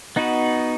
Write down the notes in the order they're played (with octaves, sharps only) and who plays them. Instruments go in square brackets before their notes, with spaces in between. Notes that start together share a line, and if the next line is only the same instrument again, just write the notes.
[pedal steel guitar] B3 D#4 F#4 B4